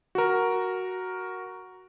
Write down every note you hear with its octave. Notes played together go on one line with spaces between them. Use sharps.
F#4 A#4